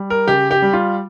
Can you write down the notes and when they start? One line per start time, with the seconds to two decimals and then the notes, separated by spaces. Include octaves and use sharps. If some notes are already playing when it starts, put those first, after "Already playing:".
Already playing: G3
0.10 A#4
0.28 C#3 G4
0.51 G4
0.62 G3
0.73 F4